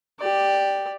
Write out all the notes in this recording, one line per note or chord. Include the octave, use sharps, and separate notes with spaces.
G4 D5